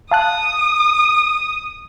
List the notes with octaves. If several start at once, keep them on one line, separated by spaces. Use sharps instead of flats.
F5 A5 D#6 F#6